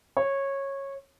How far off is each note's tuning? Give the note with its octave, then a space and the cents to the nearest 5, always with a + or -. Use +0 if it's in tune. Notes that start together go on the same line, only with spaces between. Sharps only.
C#5 -15